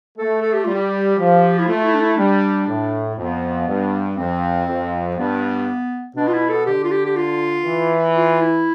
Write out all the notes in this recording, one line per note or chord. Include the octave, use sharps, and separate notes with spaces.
A3 A4
A4
G4
G3 F4
G4
F3
E4
A3 F4
E4
D4
E4
G3 D4
A2
F2 B3
G2
F2 C4
F2
G2 B3
B2 D4
F4
E4
A4
D3 G4
F4
G4
G4
F4
E3
F4
E4